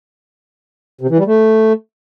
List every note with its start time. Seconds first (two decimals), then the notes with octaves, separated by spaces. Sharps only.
1.01 C3
1.10 E3
1.18 G3
1.27 A3